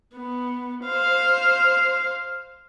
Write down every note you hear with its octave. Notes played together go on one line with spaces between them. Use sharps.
B3
C5 F5